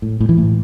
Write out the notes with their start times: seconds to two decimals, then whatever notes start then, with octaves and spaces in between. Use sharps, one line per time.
0.02 A2
0.20 A2
0.29 E3
0.38 A2